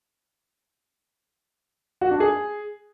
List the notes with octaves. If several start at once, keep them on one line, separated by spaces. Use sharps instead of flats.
F#4
D4
G#4